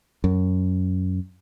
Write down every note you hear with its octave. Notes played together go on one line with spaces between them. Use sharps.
F#2